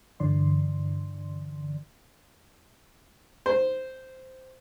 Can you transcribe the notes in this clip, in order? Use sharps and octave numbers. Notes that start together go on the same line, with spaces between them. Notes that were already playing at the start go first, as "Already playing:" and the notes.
G2 D3 E3 D5 C6
C5